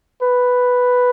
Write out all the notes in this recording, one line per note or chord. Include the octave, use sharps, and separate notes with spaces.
B4